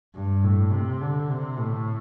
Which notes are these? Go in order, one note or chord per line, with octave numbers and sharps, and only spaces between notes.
G2
A2
C3
D3
C3
A2